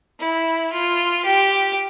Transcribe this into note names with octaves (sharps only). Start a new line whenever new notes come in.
E4
F4
G4